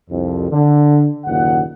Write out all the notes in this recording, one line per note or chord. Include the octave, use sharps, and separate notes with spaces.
C2 F2
D3
F#1 D#2 A#2 F#5